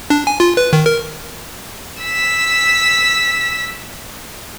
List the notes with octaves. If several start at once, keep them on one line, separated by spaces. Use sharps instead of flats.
D4
G#5
F4
B4
D#3
A#4
E6 B6